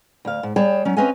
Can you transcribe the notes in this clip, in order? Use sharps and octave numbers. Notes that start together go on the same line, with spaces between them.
D2 F5
G#2
G3 G#4 C#5 G5 A5
F#3 C#4
C4 C#4 B4 D#5 F5 G#5